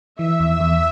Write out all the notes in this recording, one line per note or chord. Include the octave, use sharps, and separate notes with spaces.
E3 E5
E2
E2